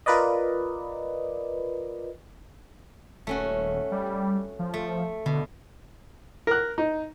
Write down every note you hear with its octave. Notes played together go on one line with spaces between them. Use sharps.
F4 A#4 B4 D5 D#5
D#1 A3 C#4 F#4
G3
F3
A3
B2 D3
A#4 F#6
D#4